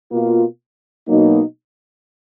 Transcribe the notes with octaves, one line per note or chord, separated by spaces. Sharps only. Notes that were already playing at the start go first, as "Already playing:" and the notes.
B2 A#3 F4
B2 F#3 A#3 D#4